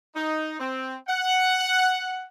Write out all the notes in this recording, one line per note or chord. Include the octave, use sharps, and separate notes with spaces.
D#4
C4
F#5